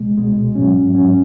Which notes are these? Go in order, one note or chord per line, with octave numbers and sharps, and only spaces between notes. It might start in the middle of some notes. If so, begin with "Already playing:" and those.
Already playing: C#2 B2 G#3
C#2 B2 G#3
G#2 F#3 C#4
G#2 F#3 C#4